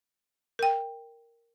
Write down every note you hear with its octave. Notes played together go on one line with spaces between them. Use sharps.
A#4 G5